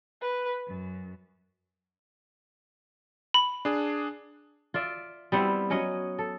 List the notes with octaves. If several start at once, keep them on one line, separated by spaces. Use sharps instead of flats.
B4
F#2
B5
D4 G#4
F4 D5 E5
G3 B3 C4 E4
F#3 C#4 C#5 D#5
A4